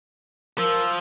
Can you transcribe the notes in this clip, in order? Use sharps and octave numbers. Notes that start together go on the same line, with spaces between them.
F3 A#4 E6